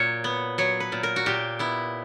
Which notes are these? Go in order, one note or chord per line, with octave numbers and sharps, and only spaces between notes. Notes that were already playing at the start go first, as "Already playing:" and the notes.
Already playing: A#2 F#3 C#5
B3
F#3 C#5
B4
A#2
A#4
F#4
A#2 G4
B3 E4